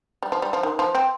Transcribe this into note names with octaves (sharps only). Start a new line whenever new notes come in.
G3
F3
G3
F3
D#3
F3
C4